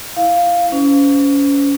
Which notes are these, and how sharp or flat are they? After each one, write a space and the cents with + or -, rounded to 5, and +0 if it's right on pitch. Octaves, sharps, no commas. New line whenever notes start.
E4 +0 F5 +0
C#4 +25 C5 -35